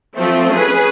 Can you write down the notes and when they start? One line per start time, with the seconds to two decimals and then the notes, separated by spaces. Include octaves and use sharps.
0.15 F3 A3 C4
0.52 C#4 G#4 B4